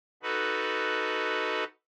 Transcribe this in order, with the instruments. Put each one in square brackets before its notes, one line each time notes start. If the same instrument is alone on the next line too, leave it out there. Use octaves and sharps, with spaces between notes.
[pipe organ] D#4 F#4 A4 B4